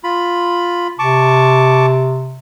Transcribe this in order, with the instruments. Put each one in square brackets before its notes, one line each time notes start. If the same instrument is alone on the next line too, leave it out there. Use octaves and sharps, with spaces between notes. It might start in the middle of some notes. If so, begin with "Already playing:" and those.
[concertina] F4 B5
[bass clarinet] C3 [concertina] A5 C#6 D6